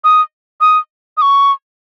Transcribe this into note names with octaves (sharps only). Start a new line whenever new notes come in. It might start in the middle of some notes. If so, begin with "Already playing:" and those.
D#6
D#6
D#6
C#6